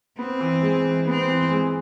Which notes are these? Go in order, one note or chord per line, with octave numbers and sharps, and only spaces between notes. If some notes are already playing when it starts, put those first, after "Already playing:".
B3 C4
E3
G#3
E3
B3 C4
E3
G#3